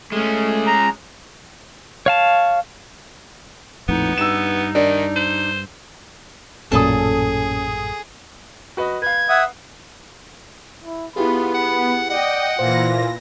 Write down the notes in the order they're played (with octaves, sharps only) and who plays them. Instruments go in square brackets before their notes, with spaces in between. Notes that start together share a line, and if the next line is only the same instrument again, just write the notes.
[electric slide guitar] G#3 C#4 [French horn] A3
[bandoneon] A#5
[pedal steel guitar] C#5 F5 A5
[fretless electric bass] A#1 F2 A2 [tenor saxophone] B3 [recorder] D#4
[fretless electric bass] G2 [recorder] D#4 [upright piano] E6 E7
[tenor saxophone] D#3 [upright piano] D4
[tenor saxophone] C5
[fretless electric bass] A1 F#2 A#2 [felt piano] C#4 D#6 [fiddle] G#4 [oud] A4
[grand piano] F#4 B4 D#5
[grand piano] B4 F5 [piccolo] G#6
[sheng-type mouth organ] E5 F#5 D#6
[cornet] E4
[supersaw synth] B3 [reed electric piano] E4 G4 G#4 [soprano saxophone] F4 [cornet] B5
[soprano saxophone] F#5
[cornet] D5 [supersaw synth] D#5 G5 [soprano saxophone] F#5
[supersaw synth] A#2 E3 A#6 [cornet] F4 [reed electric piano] C5